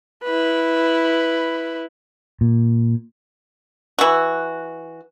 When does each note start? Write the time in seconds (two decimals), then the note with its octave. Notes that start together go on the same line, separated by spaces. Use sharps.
0.24 E4 B4
2.41 A#2
3.99 E3 F#4